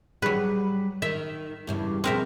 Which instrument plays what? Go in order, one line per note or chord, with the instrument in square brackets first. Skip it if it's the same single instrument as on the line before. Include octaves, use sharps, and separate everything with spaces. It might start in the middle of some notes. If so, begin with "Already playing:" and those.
[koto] F#3 B4 [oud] G3 G#4
[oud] D#3 [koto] E5
[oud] E2 G2 C#3
[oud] B2 F3 G#4 [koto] C4 A#4 E5